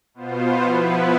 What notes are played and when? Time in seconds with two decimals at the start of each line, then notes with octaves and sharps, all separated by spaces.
0.14 B2 B3 F4 C5
0.63 F3 B3 E4 B4